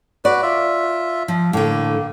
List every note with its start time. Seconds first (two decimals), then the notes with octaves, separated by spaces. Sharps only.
0.25 F#4 B4 D5
0.42 F4 E5
1.28 F3
1.53 A2 D3 A#3